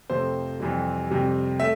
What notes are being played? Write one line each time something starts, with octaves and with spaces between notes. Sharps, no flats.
F2 C3 F3 A3 C5
F2 C3 E3 G3
F2 C3 G3
A3 E5